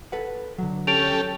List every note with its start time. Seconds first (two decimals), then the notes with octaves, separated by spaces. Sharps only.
0.12 A4 B4 F#5
0.58 D3 F#3
0.87 C#4 G4 A4 D7 F7